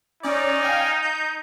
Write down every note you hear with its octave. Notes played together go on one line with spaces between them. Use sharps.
C#4 D#4 D5
F5 G5 G#5
G6